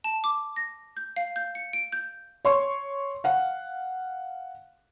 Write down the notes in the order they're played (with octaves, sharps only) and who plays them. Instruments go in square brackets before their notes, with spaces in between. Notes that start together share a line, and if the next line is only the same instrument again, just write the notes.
[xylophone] A5
D6
A#6
G6
F5
G6
C#7
D7
G6
[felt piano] C#5 C6 C#6
F5 F#5